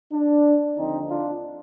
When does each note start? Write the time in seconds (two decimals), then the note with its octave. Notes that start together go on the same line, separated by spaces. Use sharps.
0.12 D4
0.77 D#2 D3 F3 C4 D#4
1.09 D4 F4